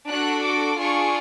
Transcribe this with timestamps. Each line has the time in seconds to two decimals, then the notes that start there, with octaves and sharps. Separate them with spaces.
0.09 D4 F#4 A4 F#6
0.44 D6
0.79 D4 F4 G#4 C#6